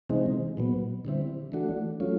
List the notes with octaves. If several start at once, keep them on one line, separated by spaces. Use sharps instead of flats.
C3 E3 G#3 C4 D#4
A#2 F#3 B3
D3 G3 C4 E4
E3 A3 D4 F#4
F#3 A3 C#4 F4